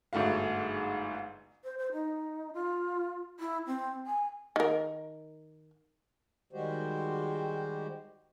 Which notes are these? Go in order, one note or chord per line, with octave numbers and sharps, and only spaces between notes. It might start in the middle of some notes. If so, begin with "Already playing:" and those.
G1 G#2 A3 F#4 F5
C5
C5
D#4
F4
E4
C4
G#5
D#3 A#4
D#3 G3 G#3 F#4 G4 C5